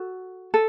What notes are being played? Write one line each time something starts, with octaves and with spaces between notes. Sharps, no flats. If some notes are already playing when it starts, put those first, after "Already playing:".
Already playing: F#4 A4
A4